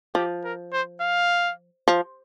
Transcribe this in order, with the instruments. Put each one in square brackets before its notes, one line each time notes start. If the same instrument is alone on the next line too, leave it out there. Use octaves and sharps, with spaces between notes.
[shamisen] F3 [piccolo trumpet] G4
[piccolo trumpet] A#4
C5
F5
[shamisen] F3